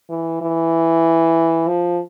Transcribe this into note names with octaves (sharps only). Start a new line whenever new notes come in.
E3
E3
F3